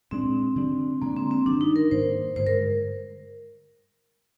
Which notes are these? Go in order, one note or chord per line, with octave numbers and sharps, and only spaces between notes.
A#2 G#3 C4 D4
D3 G3 D4
D3 G#3 A#3 D4
C4
C4
G2 D#3 G3 D4
D#4
A#4
G#2 D#3 A#3 C5
G2 D3 G#3 C5
A#4